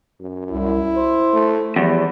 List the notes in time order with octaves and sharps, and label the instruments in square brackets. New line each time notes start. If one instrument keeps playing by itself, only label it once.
[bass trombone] F#2
[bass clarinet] C2 [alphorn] E4
[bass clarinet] C5
[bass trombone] A3
[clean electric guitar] E2 [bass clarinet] F3 [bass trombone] G3